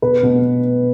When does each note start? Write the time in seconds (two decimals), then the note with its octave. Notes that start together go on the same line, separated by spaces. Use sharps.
0.02 B2 B4
0.23 B2